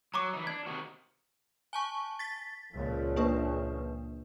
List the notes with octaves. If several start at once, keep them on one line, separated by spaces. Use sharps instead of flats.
F#3 A#5 C#6 D6
E3 D#4
D4 G#6
C3 D#3 F#4
G#5 A5 C#6
A6 B6
C#2 A#2 F3
A#3 D4 B4